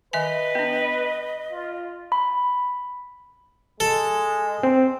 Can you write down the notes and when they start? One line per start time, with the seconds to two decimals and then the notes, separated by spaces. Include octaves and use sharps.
0.13 D#3 B4 D#5 E5 G#5
0.55 B3 D4
1.51 F4
2.12 B5
3.80 G#3 A4
4.63 C4